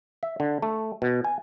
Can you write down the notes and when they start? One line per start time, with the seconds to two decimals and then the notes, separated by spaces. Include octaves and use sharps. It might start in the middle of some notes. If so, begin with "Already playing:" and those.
0.23 E5
0.40 D3
0.62 A3
1.02 B2
1.24 G#5